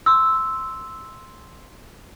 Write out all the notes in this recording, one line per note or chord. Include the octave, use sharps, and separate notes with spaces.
C6 E6